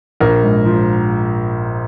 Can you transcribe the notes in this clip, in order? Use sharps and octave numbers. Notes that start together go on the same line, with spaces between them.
A#1 A#4
G#2
F3